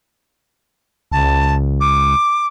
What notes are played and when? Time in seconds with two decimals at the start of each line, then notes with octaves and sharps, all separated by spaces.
1.12 C#2 A5
1.80 D6